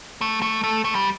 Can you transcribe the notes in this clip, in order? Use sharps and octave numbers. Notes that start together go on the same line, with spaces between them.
A3
A3
A3
A3
G3